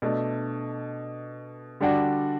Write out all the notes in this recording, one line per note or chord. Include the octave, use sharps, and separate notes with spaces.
B2 A3 D4
D3 G3 D4 F#4